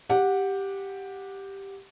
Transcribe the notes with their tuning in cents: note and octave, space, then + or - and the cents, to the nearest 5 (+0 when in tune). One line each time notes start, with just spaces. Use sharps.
G4 +0 F#5 -15